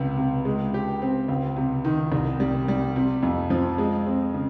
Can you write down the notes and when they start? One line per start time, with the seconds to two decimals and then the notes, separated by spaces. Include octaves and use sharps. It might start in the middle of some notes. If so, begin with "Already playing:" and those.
Already playing: C#2 C3
0.18 C3
0.45 G#3
0.74 G4
1.02 C4
1.28 C#2
1.56 C3
1.85 D#3
2.12 C2
2.40 G3
2.68 G3
2.96 C3
3.23 F2
3.50 F3
3.78 G#3
4.07 C4
4.34 C#3